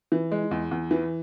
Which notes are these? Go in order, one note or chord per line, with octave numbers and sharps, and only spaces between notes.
E3
G#3
E2
E2
E3